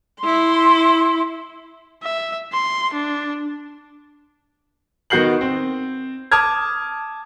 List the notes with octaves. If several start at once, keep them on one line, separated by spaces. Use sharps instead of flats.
E4 C6
E5
C6
D4
D#3 B3 F#4 G6 C7 F#7
C4
A5 D6 D#6 F6 G#6